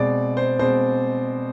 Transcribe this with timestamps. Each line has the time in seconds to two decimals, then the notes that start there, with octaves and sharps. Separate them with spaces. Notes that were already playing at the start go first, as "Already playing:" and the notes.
Already playing: B2 G#3 C4 D5
0.37 C5
0.59 B2 G#3 C4 C5